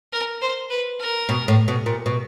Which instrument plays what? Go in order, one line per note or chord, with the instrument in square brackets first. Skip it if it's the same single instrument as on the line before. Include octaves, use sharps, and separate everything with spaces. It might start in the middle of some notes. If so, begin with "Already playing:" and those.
[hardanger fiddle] A#4
C5
B4
A#4
[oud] B2
A2
B2
A#2
B2